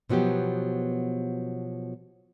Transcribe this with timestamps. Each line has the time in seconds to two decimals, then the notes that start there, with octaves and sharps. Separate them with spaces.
0.09 B2 F3 F#3 B3 G4